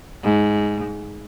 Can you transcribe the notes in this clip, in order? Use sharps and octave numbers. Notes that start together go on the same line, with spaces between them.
G#2